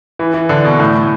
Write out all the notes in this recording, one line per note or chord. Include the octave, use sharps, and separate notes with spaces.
E3
E3
D3
B2
A2